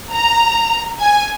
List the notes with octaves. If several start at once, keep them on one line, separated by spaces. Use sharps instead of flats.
A#5
G#5